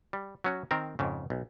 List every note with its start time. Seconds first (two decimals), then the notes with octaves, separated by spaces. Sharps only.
0.13 G3
0.44 F#3 C#4 F#4
0.71 D#3 C4 A#4
0.99 F2 G#2 C#3
1.30 B1